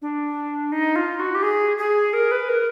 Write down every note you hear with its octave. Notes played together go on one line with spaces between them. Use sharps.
D4
D#4
F4
F#4
G4
G#4
G#4
A#4
B4
A#4